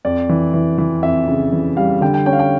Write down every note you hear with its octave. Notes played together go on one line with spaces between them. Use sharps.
F2 D5
E3
E3
E3
F2 E5
C#3
E3
G3 F5
D3 G5
G5
C#4 G5
F5
G5